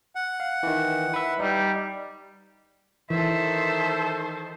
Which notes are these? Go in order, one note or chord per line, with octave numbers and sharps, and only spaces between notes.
F#5
F5
D#3 E3
B4 E5
G3 D#4
D#3 E3 A4 C5 E5